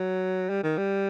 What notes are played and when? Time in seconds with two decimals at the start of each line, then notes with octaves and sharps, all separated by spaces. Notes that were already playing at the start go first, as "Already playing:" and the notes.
Already playing: F#3
0.50 G3
0.63 D#3
0.78 G3